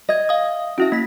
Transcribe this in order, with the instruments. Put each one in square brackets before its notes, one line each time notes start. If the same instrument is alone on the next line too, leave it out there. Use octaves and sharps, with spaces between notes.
[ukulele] D#5 [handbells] E5 G#6
[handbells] F5 D#6
[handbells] C#4 E4 E5 [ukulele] F#4
[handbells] A#3 B6